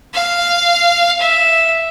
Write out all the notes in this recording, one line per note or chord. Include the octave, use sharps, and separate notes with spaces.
F5
E5